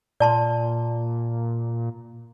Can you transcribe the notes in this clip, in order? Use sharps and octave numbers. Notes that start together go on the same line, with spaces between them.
A#2 D5 A5 C6